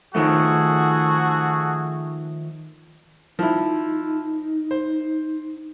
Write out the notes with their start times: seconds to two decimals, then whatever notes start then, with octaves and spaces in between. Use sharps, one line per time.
0.15 D#3 F3 A3 F#4 G#4 A4
3.39 F3 D#4 E4
4.71 C5